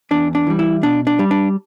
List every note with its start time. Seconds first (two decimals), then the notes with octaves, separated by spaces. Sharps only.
0.11 E2 D4
0.35 D4
0.47 E3 G3
0.59 E4
0.83 B2 D4
1.07 D4
1.19 G3
1.31 D4